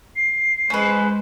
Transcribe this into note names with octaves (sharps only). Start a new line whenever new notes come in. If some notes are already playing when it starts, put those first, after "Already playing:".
C7
G#3 C#4 B4 C5